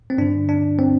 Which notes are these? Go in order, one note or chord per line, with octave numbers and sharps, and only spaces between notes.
C4
G2 D3 D4
D4
C4